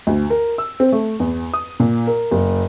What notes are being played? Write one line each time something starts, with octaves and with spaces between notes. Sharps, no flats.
D2
A#4
E6
C4
A3
E2
D#6
A#2
A#4
F#1